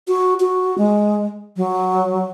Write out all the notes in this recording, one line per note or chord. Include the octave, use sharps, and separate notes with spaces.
F#4
F#4
G#3
F#3